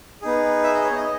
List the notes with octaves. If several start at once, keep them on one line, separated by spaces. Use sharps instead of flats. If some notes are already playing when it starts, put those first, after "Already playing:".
B3 D#4 G#4
E5
D#5
C#5
D#5